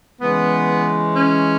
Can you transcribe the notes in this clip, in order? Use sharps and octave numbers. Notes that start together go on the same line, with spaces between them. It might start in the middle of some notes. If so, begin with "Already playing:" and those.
C#3 E3 G#3 B3
C#4